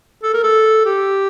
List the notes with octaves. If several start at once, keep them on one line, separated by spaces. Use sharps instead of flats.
A4
A#4
A4
G4